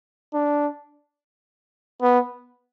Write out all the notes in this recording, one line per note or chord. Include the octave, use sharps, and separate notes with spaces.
D4
B3